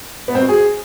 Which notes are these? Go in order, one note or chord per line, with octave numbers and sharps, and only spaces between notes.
B3
C4
F#4
G#4